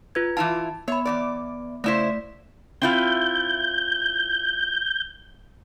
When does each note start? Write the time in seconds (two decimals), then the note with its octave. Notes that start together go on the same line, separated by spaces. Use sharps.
0.15 F4 B4 G#6
0.37 E3 E4 F4 A5
0.88 B3 C#5 B5
1.05 E2 E3 D5
1.84 C#3 A3 E4 C5 D5 B6
2.82 C4 E4 F4 G6